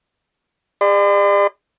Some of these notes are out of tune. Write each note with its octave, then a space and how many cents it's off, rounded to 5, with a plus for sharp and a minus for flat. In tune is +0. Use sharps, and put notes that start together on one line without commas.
G#4 -45 D5 +40 C6 -45